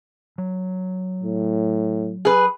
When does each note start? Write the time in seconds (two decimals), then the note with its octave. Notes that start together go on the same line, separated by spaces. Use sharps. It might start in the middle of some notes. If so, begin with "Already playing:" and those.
0.38 F#3
1.23 A2
2.25 G#4 B4